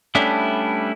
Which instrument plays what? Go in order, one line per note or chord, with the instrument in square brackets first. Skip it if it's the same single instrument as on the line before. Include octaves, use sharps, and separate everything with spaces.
[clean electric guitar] G3 A3 B3 C#4 D4 E4